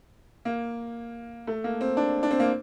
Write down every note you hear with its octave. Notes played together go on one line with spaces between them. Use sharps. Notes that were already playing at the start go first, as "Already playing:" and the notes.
A#3
A3
A#3
C4
D4
D4
C4
A#3